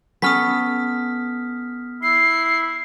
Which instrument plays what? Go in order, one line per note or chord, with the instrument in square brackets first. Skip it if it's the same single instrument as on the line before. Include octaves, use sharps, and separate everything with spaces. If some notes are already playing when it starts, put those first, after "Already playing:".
[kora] B3 C#4 A4 [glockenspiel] D#6 F6 B6
[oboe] E4 [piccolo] C7